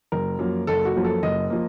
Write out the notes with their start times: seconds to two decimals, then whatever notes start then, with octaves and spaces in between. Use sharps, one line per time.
0.12 F#1 A#4
0.39 F#2 F3 A#3
0.67 F#1 A4
0.85 F#4
0.96 F#2 F3 A#3
1.05 A4
1.23 F#1 D#5
1.50 F3 A#3